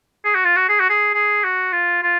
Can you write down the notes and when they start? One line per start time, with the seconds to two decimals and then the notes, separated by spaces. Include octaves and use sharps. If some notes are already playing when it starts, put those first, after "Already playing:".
0.25 G#4
0.35 F#4
0.45 F4
0.56 F#4
0.69 G#4
0.80 F#4
0.90 G#4
1.14 G#4
1.44 F#4
1.72 F4
2.03 F4